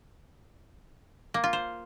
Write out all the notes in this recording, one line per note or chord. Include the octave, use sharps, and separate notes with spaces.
A#3
F4
C5